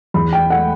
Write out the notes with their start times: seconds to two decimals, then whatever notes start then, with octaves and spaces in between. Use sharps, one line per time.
0.14 E2 B5
0.33 G5
0.50 A3 F#5